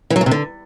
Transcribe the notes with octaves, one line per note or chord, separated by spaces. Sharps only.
E3
F#3
C#3
C3
D3